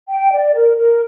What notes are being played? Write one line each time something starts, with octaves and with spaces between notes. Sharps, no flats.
G5
D5
A#4
A#4